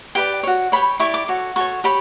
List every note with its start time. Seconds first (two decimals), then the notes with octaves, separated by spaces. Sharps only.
0.15 G4 B4 D5 G5
0.43 F#4 C#5
0.72 G4 C#5 B5
0.99 E4 G4 D5 C#6
1.14 D6
1.28 F#4 A4 C#5
1.56 F#4 A4 C#5 C#6
1.84 G4 C#5 B5